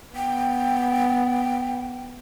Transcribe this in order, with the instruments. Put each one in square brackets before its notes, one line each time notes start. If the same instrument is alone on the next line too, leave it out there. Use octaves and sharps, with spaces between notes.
[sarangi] B3 [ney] G5